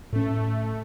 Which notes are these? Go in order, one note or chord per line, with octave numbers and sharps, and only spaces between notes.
A2 A3 C#4